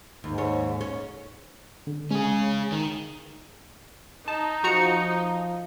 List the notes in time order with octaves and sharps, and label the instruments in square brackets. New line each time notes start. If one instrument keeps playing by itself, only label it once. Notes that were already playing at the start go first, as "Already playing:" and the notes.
[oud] D#2 [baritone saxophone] G#2
[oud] D#2 C#5
C#4
[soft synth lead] D3
[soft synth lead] G#3 [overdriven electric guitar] C#4 G#4
[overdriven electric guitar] D#3
[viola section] D#4 [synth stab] A5
[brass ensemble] F3 [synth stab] F#4 A#5 C#7